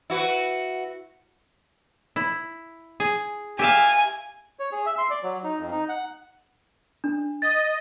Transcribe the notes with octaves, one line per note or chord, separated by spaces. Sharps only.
E4 F#4 B4
E4
G#4
G4 E5 F5 G#5
C#5
G#4
E5
C6
D5
F#3
D#4
F2
D#4
F#5
D4
D#5 A6